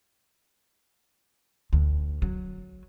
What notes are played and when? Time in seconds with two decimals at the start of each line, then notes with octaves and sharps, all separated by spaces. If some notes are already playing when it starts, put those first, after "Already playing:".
1.73 D2
2.22 F#3